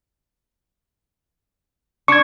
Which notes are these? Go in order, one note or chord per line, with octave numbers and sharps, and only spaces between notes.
D4 C#6 G#6